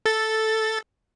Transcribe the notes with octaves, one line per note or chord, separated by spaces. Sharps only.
A4 A6